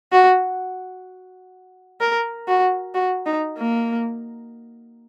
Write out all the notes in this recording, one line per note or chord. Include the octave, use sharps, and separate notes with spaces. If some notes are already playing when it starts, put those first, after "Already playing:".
F#4
A#4
F#4
F#4
D#4
A#3